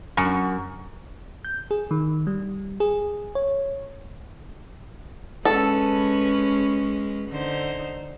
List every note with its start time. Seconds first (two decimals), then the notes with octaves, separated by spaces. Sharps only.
0.17 F#2
1.45 G6
1.71 G#4
1.91 D#3
2.27 G3
2.80 G#4
3.35 C#5
5.45 G#3 C#4 A4 B4
7.29 D3 D#4 C5